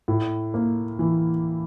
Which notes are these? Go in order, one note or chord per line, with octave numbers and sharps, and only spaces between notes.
A2
A#3
E3